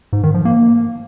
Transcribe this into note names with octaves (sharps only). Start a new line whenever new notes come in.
G#2
D#3
F3
A#3